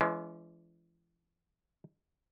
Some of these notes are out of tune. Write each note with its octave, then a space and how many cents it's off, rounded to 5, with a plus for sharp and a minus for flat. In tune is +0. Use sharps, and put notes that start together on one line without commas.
E3 +40 G#3 +30 D4 -40